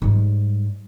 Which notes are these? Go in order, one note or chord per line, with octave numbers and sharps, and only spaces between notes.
G#2 G3